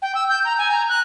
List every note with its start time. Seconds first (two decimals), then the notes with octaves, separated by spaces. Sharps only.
0.02 G5
0.15 E6
0.29 G6
0.45 A#5
0.58 G#5
0.71 A#5
0.89 F#6